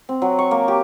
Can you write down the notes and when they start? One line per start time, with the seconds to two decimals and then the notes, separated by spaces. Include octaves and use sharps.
0.09 C4
0.22 F#3
0.39 C#6
0.51 A#3
0.68 G4